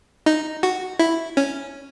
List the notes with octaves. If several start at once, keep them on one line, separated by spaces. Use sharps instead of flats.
D#4
F#4
E4
C#4